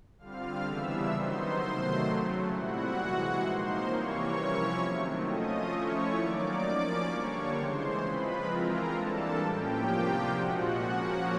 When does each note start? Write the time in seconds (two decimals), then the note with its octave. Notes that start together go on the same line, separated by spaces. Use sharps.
0.18 D3 G3 C4 F4 F5 F6
0.64 C#3 E3 G3 B3 D4 E5 E6
1.10 D#3 F#3 B3 D#4 C5 C6
1.57 C3 D#3 F#3 A3
2.02 C#3 F#3 A3
2.48 A#2 G3 C4 E4 F#4 F#5
2.94 C3 E3 G#3
3.40 F3 A#3 D#4 C5 C6
3.86 C3 E3 G3 A#3 C#5 C#6
4.32 C3 F3 A#3 C#4 E4
4.79 D#3 F#3 A3 C4
5.24 F3 A3 C#4 F4 D#5 D#6
5.70 F3 A3 C#4 E4 C#5 C#6
6.16 D#3 F#3 A#3 D#4 D5 D6
6.63 F3 A#3 C#4
7.08 D3 G3 A#3 D4 C#5 C#6
7.54 C#3 E3 G#3 C5 C6
8.00 F3 G#3 C4 F4 B4 B5
8.46 E3 G#3 C4 F4 A#4 A#5
8.91 E3 G3 A#3 D4 A4 A5
9.38 A2 F3 A#3 C#4 G4 G5
9.84 C3 F3 A#3 D4 F4
10.30 A#2 F3 G#3 F#4 F#5
10.76 F3 A#3 C#4